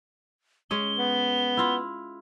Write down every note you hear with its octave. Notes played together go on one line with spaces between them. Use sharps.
G#3 C#4 G#4 G7
B3
E4 F4